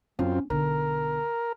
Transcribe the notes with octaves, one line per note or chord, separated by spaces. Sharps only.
F#2 C4 C#4 F4
B1 D3 A#4